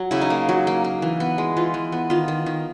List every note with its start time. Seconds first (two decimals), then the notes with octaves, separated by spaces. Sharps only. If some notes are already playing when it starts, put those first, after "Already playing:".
Already playing: F#3
0.11 C#3 E4
0.21 D#4
0.30 A#3
0.49 F#3
0.67 A#3
0.84 A#3
1.02 E3
1.20 B3
1.38 G#3
1.57 E3 F4
1.74 E3
1.92 B3
2.10 D#3 F4
2.28 D#3
2.46 D#3